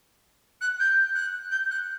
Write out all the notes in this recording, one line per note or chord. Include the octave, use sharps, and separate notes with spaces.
F#6
G6
F#6
G6
F#6